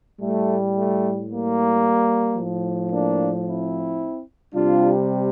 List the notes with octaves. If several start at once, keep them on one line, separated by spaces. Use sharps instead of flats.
A2 G3 A3
A3
G3 A#3
A2 F3
A#3 D4
C4 E4
C3 G3 D4 F4